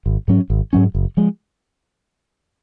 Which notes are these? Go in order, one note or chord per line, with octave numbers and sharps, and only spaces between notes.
G#1
G#2 F#3 C#4
G#1
G#2 F#3 C#4
F#1
F3 G#3